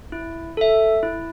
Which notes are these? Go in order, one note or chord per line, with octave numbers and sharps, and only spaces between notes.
E4
A4 E5
E4